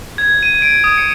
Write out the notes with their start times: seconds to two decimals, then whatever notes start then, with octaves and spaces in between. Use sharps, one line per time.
0.18 G#6
0.43 D#7
0.62 D7
0.84 D#6
0.98 C#7